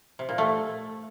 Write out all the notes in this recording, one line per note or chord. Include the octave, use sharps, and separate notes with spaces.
C3
A#2
A3